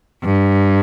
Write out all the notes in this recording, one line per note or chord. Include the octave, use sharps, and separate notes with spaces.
G2